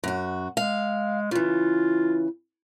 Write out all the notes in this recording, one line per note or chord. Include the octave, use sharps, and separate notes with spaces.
F#2 F#4
G#3 F5
C#3 E3 F4